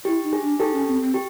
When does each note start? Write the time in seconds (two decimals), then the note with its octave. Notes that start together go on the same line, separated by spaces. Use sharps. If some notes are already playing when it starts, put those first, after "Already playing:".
0.05 E4 G4
0.23 D#4
0.33 G#4
0.42 D4
0.59 D#4 G4 A4
0.73 C#4
0.87 C4
1.02 C4
1.14 G4